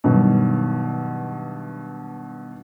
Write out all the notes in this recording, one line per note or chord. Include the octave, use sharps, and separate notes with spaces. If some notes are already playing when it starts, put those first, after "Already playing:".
G2 B2 D#3 F#3